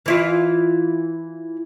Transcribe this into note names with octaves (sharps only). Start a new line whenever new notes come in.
E3 E4 F4